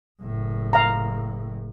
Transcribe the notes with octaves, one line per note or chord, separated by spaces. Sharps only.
F#1 A2
F5 A#5